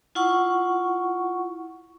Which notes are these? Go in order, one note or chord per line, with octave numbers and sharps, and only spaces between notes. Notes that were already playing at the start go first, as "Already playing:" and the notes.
E4 F4 F#5 C#6